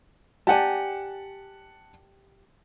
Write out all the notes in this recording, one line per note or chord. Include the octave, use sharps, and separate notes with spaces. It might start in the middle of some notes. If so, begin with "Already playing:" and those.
G4 D5 F#5 G#5 A5